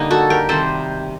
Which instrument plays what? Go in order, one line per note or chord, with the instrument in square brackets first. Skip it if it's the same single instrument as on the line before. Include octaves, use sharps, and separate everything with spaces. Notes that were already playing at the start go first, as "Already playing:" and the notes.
Already playing: [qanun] D3 G3 A#3 D#4
F#4 A4
G4 A#4
C3 D#3 G3 A4 C5